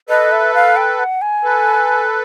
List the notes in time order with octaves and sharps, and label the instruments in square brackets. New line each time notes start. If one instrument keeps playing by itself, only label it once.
[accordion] A4 B4 [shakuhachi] D#5
[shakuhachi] E5
F5
G5
F#5
G#5
[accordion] A4 B4